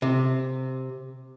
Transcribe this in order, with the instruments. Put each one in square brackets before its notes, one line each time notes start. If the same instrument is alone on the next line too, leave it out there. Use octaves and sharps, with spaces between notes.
[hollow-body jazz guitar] C3